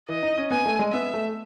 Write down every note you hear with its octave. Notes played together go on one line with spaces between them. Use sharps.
E3 D#5
D#4
C#4
B3 G#5
A3
G#3
B3 E5
A3